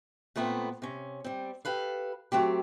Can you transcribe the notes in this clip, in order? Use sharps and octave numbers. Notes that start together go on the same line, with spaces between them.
A#2 A3 B3 C4
C3 C#4
G3 C4
G4 A4 B4 F5
F#3 A3 C4 G4